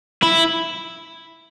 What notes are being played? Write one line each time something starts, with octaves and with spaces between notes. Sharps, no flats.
E4